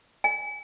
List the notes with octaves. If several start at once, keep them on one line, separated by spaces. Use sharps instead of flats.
G#5